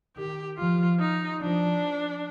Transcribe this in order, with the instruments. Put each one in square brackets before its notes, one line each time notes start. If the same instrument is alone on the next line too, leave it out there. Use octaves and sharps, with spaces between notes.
[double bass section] D#3 [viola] G4
[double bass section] F3 [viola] F4
[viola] D#4
[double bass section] F3 [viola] D4